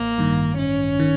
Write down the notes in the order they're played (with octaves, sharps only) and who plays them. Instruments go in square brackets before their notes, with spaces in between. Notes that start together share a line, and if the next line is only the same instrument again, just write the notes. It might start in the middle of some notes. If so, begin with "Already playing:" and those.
Already playing: [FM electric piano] A1 [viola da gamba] A#3
[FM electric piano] G2 D#3
[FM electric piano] A1 [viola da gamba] C#4
[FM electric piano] D#3